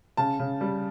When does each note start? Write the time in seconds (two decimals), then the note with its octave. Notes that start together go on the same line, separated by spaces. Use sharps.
0.17 C#3 A5
0.39 C#3
0.61 G3